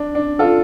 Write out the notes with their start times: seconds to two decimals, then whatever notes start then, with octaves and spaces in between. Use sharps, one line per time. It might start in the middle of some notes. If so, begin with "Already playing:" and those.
Already playing: D4
0.15 D4
0.39 F4 A4